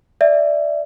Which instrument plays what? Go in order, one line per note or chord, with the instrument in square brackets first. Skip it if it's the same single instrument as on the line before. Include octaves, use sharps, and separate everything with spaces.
[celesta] D5 E5